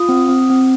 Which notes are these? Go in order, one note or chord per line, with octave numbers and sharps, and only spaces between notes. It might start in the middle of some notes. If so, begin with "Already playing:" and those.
Already playing: F4 D#6
C4
C4
C4